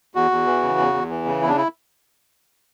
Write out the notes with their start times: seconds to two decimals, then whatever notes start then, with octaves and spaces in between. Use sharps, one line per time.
0.15 E2 F#4
0.31 E2
0.46 E3
0.62 C#3
0.78 E2
0.93 E2
1.10 E3
1.25 C#3
1.41 E2 E4
1.49 D4
1.56 E4